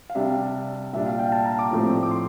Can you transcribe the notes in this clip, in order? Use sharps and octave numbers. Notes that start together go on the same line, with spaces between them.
F5
C3 G3 D4 E5
A#2 G3 D4 E5
F5
G5
A5
A#5
D6
A2 F3 A3 C4
D6
C6